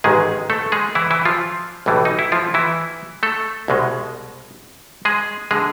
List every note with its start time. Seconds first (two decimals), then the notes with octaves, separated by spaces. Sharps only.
0.04 A1 G#2 D#3 G#3 G#4
0.50 A3 A4
0.72 G#3 G#4
0.95 E3 E4
1.11 E3 E4
1.25 F3 F4
1.86 B1 A2 E3 G3
2.05 D#4
2.19 E4
2.32 F3 F4
2.54 E3 E4
3.23 A3 A4
3.68 C2 B2 G#3
5.05 G#3 G#4
5.51 D3 G#3 G#4